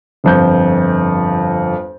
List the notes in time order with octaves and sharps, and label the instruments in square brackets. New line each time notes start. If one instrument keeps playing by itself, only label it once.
[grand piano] G1 F2 G6